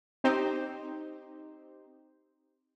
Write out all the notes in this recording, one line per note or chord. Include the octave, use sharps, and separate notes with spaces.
C4 D#4 G4 C5